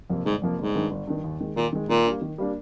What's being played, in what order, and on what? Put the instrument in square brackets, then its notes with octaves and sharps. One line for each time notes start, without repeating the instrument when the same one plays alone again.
[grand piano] F2 C3 F3 A#3
[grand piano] G1 [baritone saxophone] G#2
[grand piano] F2 C3 F3 A#3
[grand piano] G1 [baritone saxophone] G#2
[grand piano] G2 D#3
G1
G2 D#3
D#2
D#3 G#3
[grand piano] D#2 [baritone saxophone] A#2
[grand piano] D#3 G#3
[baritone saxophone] A#2 [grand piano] D#3
[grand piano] G3 A#3 D4
D#3
G3 A#3 D4